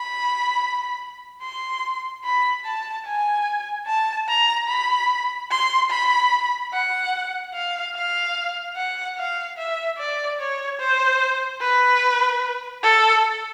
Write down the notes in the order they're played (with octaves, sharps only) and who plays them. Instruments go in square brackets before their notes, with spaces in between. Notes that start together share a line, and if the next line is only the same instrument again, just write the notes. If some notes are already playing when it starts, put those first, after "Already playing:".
Already playing: [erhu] B5
C6
B5
A5
G#5
A5
A#5
B5
C6
B5
F#5
F5
F5
F#5
F5
E5
D5
C#5
C5
B4
A4